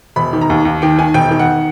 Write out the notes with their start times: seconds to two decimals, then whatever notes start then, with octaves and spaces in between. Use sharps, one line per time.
0.16 E1 B5
0.33 D#3
0.41 A#5
0.50 D#2
0.65 D#2
0.82 D#3 G5
0.99 D#3 G#5
1.14 E1 G5
1.31 D#3
1.39 F#5